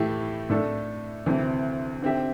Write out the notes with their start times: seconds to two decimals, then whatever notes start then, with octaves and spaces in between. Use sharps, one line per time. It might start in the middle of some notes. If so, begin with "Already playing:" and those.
Already playing: A2 E3 A3 E4 G4
0.50 A2 A3 D4 A4
1.26 D2 C3 E3 C4
2.02 D3 C4 G4 E5